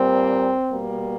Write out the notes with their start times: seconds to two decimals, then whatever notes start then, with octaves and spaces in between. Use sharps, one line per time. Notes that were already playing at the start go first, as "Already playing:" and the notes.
Already playing: A#2 G3 A#3 C4
0.69 B2 G3 A#3